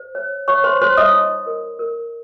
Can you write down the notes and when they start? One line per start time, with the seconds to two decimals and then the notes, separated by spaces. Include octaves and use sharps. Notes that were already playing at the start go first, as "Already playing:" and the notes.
Already playing: C5
0.15 C#5
0.48 C#5 C#6
0.64 C5 C6
0.81 C5 C#5 C6
0.97 D#5 D#6
1.13 D#4
1.47 A#4
1.79 A#4